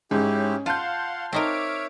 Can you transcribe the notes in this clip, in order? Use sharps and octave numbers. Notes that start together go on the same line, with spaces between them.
G#2 C#4 E4 G4
F4 F5 F#5 A5 C6 G6
C4 D#4 A#4 C#5 E5 D6 F6 D7